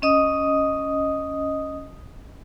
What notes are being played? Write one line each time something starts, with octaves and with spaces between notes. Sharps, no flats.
C#4 D#5 D#6